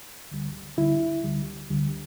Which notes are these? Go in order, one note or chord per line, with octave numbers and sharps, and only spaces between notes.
D2 D3 G3
D2 D3 G3 E4
D2 D3 G3
D2 D3 G3